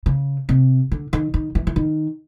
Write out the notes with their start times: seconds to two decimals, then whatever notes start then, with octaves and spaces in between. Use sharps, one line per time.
0.06 C#3
0.49 C3
0.92 D3
1.13 D#3
1.34 D#3
1.55 E3
1.67 E3
1.76 D#3